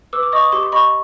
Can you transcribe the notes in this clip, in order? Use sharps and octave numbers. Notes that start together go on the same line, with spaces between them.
B4 D6 E6
D6
D#5 C#6 D#6
G4 C6 D6
C6
D#5 B5 C#6